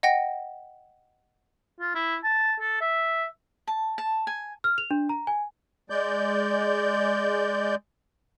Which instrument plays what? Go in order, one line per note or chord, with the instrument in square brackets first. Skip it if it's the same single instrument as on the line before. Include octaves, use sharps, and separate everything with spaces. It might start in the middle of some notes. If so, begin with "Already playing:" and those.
[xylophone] D#5 F#5 G5 A#6
[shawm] F4
E4
A5
A4
E5
[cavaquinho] A5
A5
G#5
[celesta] F6
F7
D4
A#5
G#5
[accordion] G#3 D5 G6